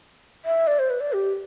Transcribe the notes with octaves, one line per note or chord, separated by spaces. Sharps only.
E5
D5
C5
B4
D5
G4